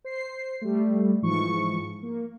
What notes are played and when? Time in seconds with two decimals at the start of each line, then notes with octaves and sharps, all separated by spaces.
0.04 C5 C7
0.61 G3 A3
1.22 G#2 E3 F3 C#6
2.02 A#3